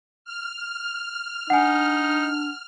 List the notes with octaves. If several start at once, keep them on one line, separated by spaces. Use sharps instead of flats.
F6
D4 D#4 F#5 G#5